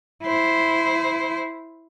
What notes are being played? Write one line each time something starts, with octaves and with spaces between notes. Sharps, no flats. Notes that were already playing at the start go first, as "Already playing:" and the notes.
E4 C5